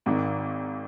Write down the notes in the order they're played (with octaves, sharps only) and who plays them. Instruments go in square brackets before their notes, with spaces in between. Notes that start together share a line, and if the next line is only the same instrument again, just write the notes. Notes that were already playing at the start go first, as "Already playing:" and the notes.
[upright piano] G#1 G#2 D#3